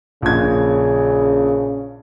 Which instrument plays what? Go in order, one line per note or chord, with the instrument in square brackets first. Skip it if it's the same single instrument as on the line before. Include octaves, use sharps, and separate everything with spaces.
[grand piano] A#1 G#6 [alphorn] C#3